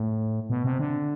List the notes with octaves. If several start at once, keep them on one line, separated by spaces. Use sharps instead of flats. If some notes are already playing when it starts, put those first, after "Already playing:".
Already playing: A2
B2
C3
D3